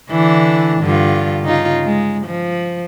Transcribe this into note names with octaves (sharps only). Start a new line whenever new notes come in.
D3 E3 D4
G2 D3 F4
C#3 D#4 F4
G#3
F3